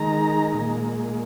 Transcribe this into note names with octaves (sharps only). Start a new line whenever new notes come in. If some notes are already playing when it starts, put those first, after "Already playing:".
Already playing: D#3 G#3 A#5
A#2 G#3